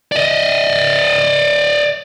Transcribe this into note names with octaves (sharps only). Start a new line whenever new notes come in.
D5 D#5